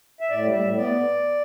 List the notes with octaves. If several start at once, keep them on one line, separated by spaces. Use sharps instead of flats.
E5
A2 D5
G3
E5
A2
B3 D5